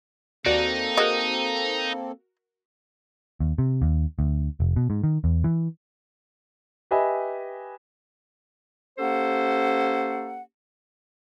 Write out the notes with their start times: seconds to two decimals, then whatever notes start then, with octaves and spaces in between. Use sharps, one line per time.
0.46 D#2 A#3 C4 D#4 F#4 A4 D5
0.97 F#4 G#4 A#4 D#5
3.40 D#2
3.58 C3
3.82 D#2
4.19 D2
4.60 F1
4.76 B2
4.90 G#2
5.04 D#3
5.24 E2
5.44 E3
6.91 G4 B4 D#5 E5 G#5
8.99 A#3 C#4 G4 A4 C5 F#5